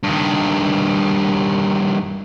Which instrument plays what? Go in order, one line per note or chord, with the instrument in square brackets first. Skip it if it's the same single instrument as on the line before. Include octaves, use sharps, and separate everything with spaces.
[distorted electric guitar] G2 D#3